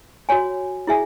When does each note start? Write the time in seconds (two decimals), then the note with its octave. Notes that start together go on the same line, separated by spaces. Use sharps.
0.29 F#4 C#5 G#5
0.87 E4 G#4 E5 G#5